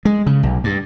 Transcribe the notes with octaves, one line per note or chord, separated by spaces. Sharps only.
G#3
C#3
B1
G2